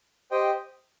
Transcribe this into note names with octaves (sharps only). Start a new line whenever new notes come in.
G4 C5 D#5 G5